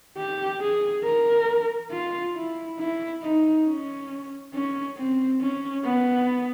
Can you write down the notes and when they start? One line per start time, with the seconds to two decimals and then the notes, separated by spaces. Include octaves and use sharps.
0.18 G4
0.61 G#4
1.04 A#4
1.92 F4
2.35 E4
2.79 E4
3.23 D#4
3.67 C#4
4.54 C#4
4.97 C4
5.41 C#4
5.85 B3